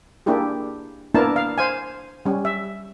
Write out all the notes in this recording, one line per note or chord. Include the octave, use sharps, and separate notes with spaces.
A#3 D4 E4 G4 G#4
A#3 B3 D4 E4 A#4 A5
F5
C5 F5 G#5
G3 C#4
E5